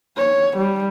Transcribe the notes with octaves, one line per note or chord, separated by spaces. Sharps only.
C#5
G3